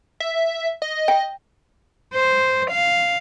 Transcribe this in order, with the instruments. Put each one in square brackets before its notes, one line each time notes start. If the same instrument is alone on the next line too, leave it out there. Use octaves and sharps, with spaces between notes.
[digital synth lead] E5
D#5
[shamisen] G5
[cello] C5
F5